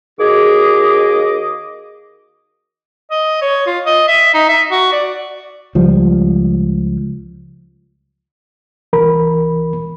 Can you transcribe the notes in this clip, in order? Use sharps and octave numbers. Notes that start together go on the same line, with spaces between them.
D#2 F#4 G#4 D#5 D6
D#5
C#5
F4
D#5
E5
D#4
E5
F#4
D5
C#2 F3 G3
C2 E3 A#4 B5